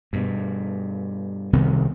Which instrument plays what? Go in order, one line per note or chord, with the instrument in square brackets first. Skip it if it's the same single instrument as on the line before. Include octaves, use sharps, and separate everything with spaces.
[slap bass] G2 B2
C2 C3 D#3 B3